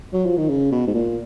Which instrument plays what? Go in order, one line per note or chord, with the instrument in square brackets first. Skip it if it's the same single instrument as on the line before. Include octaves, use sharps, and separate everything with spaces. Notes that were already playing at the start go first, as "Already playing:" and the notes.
[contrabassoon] F#3
F3
D#3
C#3
B2
G#2
A#2